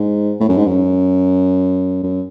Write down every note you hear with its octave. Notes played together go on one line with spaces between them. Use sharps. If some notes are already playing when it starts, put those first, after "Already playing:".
Already playing: G#2
A2
F#2
G#2
F#2
F#2